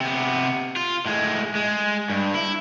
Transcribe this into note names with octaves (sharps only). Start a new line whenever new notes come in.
C3 B3
F4
A2 G#3
G#3
G2
E4